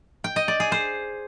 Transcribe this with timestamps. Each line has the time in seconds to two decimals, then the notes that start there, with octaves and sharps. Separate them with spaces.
0.24 G5
0.36 D#5
0.48 D5
0.60 G#4
0.72 C5